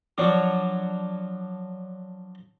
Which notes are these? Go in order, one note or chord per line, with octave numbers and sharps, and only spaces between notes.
F3 F#3 D4 C#5